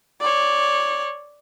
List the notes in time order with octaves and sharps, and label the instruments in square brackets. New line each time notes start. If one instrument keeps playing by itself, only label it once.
[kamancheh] C#5 D5